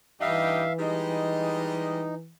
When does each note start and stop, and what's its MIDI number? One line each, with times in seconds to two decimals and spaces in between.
0.21 0.66 43
0.21 2.32 52
0.21 0.66 63
0.21 0.66 67
0.21 0.73 76
0.21 0.73 77
0.79 2.06 55
0.79 2.06 56
0.79 2.15 63
0.79 2.06 75